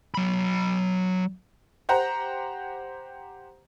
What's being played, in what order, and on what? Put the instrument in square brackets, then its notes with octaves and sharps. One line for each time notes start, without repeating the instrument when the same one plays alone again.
[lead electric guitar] F#3 B5
[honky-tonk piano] G4 C5 F#5 A#5